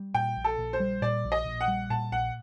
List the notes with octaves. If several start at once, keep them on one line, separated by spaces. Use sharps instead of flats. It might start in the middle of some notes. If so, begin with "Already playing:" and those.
Already playing: G3
A#2 G5
A#1
A4
A#1
C5
G3
A#2 D5
A#1
D#5
A#1
F#5
G3
A#2 A5
A#1 F#5